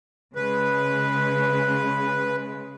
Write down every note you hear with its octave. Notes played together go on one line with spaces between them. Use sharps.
C#3 G#3 B4